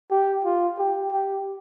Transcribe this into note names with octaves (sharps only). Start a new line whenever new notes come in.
G4
F4
G4
G4